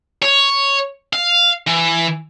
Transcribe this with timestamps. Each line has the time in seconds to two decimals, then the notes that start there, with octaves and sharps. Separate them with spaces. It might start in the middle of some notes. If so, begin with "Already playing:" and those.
0.23 C#5
1.13 F5
1.67 E3